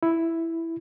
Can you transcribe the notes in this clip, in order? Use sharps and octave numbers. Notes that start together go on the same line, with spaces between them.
E4